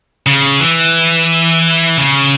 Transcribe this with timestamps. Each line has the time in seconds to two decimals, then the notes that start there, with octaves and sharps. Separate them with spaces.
0.26 C#3
0.60 E3
1.98 C#3